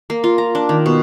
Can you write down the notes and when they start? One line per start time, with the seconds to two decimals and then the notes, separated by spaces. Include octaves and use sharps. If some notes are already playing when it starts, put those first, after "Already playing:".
0.10 A#3
0.24 F4
0.38 A#5
0.55 D4
0.69 D#3
0.86 B2